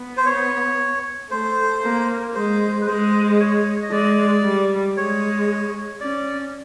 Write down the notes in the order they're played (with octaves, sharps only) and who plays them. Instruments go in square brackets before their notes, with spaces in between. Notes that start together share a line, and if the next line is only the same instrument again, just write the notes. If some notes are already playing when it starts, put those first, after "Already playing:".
Already playing: [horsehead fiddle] B3
[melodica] C5
C#5
[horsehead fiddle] A3 [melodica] C5
[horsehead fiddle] A#3
[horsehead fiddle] G#3 [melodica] C5
[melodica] B4
[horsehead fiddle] G#3 [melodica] C5
[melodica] C#5
D#5
[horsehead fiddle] G#3 [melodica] D5
[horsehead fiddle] G3
[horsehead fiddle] G#3 [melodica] C#5
[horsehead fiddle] C#4 [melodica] D5